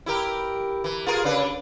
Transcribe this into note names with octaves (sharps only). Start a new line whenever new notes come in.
E4 G4 A#4
E3
F4 G#4 A#4
C#3 D4 B4